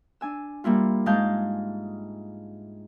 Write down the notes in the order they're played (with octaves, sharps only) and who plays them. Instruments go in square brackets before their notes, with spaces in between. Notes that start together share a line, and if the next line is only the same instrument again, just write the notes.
[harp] D4 G#5 E6
G3 A#3 E4 F4
G#2 G#3 F5 A5 G6